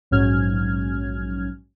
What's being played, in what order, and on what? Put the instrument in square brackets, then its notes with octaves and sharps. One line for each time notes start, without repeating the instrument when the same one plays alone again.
[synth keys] A#1 G#2 F#3 C#4 F6 G#6